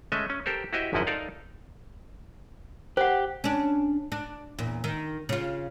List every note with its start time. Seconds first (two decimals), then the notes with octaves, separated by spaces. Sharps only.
0.12 G#3 A3 C#4 D#5 E5
0.30 C#4
0.46 G4 A4 A#4 C5
0.73 E4 F#4 G4 C5 D#5 E5
0.93 G#1 F#2 F3 E4 D#5 F#5
1.07 D#4 A4 A#4 D5 F5
2.97 G4 C5 F#5
3.44 C#4 D4
4.12 D4
4.58 E2 A#2
4.84 D#3
5.29 C#3 F4